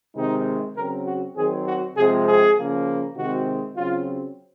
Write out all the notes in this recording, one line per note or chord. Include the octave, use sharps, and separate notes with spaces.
C3 D#3 G#3 C4 D#4
C#3 F#3 C4 A#4
F#4
D#3 F#3 C4 G#4
F#4
C3 F3 G#3 C4 G#4
G#4
C#3 F3 A#3
C3 D#3 G#3 C4 F#4
C#3 F#3 C4 F4